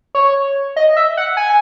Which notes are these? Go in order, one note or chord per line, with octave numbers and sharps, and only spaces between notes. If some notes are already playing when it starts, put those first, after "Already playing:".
C#5
D#5
E5
F#5
G#5